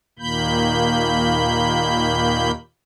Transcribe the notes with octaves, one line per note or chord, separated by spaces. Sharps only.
D#2 A#2 D#3 A#3 B5 G6